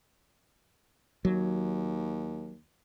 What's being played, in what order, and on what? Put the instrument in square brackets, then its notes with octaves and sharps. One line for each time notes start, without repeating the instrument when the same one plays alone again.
[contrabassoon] D#2 [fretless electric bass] F#3